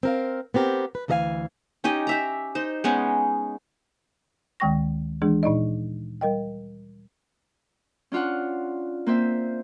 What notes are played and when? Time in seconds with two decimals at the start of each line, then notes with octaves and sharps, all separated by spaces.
0.03 C4 A#4 F5
0.54 B3 C4 G4 A#4
0.95 B4
1.08 D2 E3 A4 D#5 F5 G#5
1.84 C#4 D#4 G4 D#5
2.07 G4 E5 A#5
2.55 D#4 C5
2.84 G#3 B3 C#4 D#4
4.60 D2 D#3 G#3 G5 C#6 A#6
5.22 E3 G#3 D4 G#4
5.43 A#2 D#4 D5 D#5
6.21 G3 A#4 D#5 G5
8.12 C#4 D4 F4 F5 F#5
9.06 A#3 C4 C5 E5